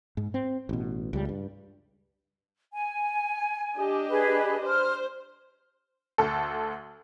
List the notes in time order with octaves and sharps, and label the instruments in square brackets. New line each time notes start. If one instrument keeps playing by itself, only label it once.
[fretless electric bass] G#2
C4
A1 B2
C#2 G3
G2
[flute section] G#5
[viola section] D4 G4 D#5
[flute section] G#4 B4
[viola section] C5 [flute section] F6
[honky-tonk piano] D2 A4